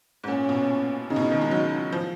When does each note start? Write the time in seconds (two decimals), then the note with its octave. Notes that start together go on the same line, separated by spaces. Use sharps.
0.24 G#2
0.28 A#2 C#4
0.49 B2
1.10 C#3 D#4
1.16 B2
1.20 C#3
1.31 D#3
1.41 G#3
1.51 F#3
1.93 F3